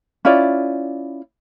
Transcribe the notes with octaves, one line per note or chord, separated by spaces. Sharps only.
C#4 E4 F4 D5